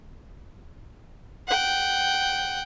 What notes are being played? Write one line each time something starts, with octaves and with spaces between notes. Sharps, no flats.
F#5 G5